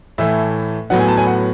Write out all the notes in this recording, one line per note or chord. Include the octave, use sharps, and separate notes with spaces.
A2 E3 A3 E5
A2 F#3 B3 F#5
G#5
A5
G#5
F#5